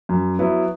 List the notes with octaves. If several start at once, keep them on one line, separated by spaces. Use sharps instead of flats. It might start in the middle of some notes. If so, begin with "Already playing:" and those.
F#2
F#3 B3 E4